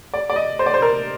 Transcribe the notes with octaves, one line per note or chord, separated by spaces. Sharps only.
D5
D5
D#5
C5
D5
C5
A#4